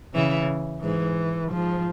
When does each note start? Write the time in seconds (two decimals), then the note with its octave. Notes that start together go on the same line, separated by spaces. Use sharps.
0.15 C#3 E3
0.82 G#2 E3
1.51 G#2 F3